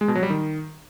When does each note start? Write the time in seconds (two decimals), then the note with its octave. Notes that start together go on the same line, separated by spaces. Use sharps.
0.01 G#3
0.08 B2
0.15 F#3
0.23 G3
0.30 D#3